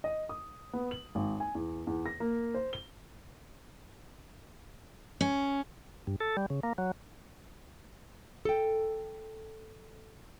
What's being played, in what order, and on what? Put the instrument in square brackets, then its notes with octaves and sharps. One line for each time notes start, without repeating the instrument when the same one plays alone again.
[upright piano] D#5
D#6
B3
F#7
G#1
G#5
E2
E2
A#6
A#3
C5
G7
[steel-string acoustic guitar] C#4
[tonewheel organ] G2
A4
G3
C#3
A#3
F#3
[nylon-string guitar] A4 G5